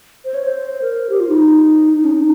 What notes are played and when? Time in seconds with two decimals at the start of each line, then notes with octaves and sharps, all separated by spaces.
0.24 C5
0.34 C#5
0.43 C5
0.82 A#4
1.09 G4
1.20 F4
1.29 D#4
1.96 D#4
2.04 C#4
2.12 D#4